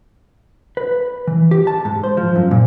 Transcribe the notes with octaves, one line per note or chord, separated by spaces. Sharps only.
B4
E3
G4
A5
G#2
C5
F3
F#2
A#2